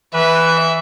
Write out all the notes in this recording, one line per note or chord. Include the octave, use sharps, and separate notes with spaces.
E3 B4 E5